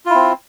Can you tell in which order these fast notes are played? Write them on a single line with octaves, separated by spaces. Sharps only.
F4 E4 C4